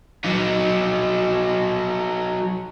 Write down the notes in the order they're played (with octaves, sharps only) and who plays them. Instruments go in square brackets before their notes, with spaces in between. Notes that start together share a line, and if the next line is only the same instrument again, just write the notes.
[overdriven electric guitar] F#3 D#4